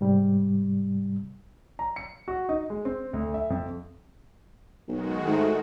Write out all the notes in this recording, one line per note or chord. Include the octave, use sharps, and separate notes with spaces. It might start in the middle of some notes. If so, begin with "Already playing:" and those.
G#2 C3 G3
A#5
C#7
F#4
D#4
G#3
C4
D2
E5
F2
B1 D#3 G#3 F#4
G#2 A3